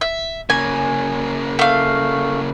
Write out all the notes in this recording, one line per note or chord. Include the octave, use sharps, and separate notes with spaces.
E5
C#3 A#3 G#5
A3 F5